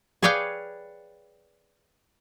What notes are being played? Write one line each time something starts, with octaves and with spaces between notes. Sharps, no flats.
G#4 B4 C#5 D5 F5 G5